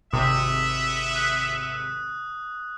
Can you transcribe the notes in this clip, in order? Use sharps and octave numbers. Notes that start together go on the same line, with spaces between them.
G#1 C3 B3 E5 D#6
D#6 F#6